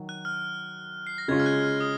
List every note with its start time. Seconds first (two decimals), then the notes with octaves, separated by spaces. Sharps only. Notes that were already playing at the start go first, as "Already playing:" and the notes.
Already playing: D#3 F#3
0.09 F#6
0.25 F6
1.07 C7
1.18 A#6
1.28 C#3 G#3 C#4 F4 G#6
1.39 F6
1.46 F#6
1.63 F6
1.80 D#6